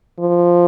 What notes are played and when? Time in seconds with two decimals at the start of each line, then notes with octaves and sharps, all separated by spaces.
0.20 F3